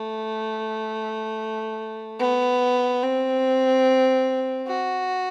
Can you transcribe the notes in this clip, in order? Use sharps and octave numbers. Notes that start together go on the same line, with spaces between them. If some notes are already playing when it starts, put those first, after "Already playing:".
Already playing: A3
B3
C4
F#4